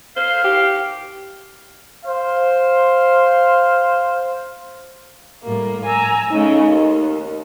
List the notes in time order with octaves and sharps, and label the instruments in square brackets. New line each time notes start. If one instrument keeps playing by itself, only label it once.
[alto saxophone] C5 [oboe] F5
[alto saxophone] G4
[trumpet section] C5 F5
[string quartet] A2 G3 A#3
G#5 A#5 E6
[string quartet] C#3 A3 [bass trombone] D#4
[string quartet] D#2